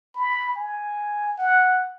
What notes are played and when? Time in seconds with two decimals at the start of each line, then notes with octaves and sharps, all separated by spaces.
0.15 B5
0.56 G#5
1.38 F#5